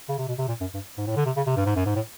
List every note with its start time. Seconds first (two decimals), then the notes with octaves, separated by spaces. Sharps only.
0.09 C#3
0.18 C3
0.28 B2
0.38 C3
0.48 A#2
0.60 F#2
0.74 G2
0.98 G#2
1.07 A2
1.16 D3
1.26 C3
1.36 C#3
1.46 C3
1.56 G2
1.66 G#2
1.76 F#2
1.86 G#2
1.95 A2